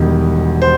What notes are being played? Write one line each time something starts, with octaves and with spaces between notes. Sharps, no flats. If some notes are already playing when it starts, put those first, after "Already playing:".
Already playing: E1 E2 D#3 G3
C5